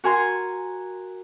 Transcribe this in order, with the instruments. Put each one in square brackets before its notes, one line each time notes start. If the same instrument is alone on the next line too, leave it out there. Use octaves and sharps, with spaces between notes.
[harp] F#4 A#4 G#5 C6